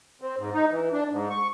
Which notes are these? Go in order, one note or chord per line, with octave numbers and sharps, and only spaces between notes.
C4
G#2
D#4
E3
D4
G#2
C#6